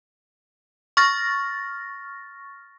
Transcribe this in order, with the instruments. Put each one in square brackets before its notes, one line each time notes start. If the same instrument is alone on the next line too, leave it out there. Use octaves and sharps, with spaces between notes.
[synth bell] C#6 F6 A6 A#6